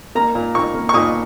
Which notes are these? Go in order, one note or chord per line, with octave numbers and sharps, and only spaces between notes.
A#3 A#5
A#2
A#2 C#6
A#3
C#6
A#2 D#6